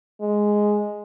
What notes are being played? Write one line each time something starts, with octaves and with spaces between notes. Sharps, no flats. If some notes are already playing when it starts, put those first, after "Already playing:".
G#3